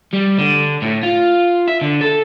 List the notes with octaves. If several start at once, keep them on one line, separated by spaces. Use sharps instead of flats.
G3
D3
A2
F4
E5
D3
A4